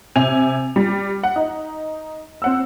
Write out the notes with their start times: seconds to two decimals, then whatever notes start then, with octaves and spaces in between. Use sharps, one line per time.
0.16 C3 G#5 F7
0.76 G3
1.23 F#5
1.36 D#4
2.42 C4 F#5 E6